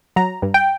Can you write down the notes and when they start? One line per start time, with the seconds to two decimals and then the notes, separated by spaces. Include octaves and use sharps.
0.16 F#3 A#5
0.42 G2
0.54 G5